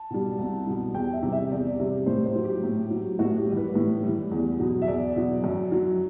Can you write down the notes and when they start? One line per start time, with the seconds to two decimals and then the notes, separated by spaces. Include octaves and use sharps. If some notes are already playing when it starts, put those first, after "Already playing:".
Already playing: A5
0.10 B2 G3
0.39 C2
0.67 B2 G3
0.94 E2 G5
1.13 E5
1.22 C3 G3
1.32 E5
1.52 E2 D5
1.80 C3 G3
2.06 A2 C5
2.26 C5
2.35 F#3
2.44 G4
2.64 A2
2.91 F#3
3.19 A2 F#4
3.38 G4
3.47 G3
3.52 E3
3.57 B4
3.75 A2
4.03 E3 G3
4.31 E2
4.60 B2 F#3
4.82 E5
4.87 E2 D5
5.16 B2 F#3
5.44 F#2
5.72 F#3